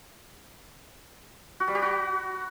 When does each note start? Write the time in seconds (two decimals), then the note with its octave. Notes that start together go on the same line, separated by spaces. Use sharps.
1.60 F#4
1.68 G3
1.75 G4
1.82 F#4